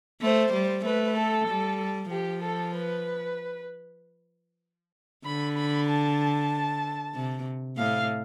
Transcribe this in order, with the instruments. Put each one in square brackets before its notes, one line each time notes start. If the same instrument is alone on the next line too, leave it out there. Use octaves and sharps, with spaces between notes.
[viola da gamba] A3 [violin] C5
[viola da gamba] G3
[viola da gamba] A3 [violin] B4
[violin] A4
[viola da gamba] G3
[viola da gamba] F3 [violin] G4
[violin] A4
B4
[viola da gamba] D3 [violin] B5
[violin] B5
A5
[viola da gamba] C3
[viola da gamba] A2 [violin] F5